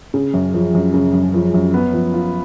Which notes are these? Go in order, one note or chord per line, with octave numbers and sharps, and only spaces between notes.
C#3
F#2
F3
F#2
C#3
F#2
F3
F#2
B3
F3
F4